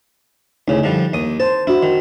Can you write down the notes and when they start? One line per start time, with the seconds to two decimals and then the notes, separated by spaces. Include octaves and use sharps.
0.68 D2 C#3 D#4 E4
0.83 D3 F3 G3
1.13 D#2 D#6
1.40 C5 A5
1.67 D4 E4 F#4
1.83 D#3